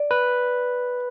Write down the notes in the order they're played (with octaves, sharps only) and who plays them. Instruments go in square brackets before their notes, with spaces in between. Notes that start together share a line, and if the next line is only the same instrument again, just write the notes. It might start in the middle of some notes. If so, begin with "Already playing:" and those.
Already playing: [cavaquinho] D5
[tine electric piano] B4